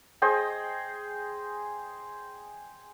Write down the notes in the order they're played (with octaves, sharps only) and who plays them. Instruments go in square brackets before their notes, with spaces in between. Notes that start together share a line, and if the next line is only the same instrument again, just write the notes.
[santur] G#4 C5 D#5 G5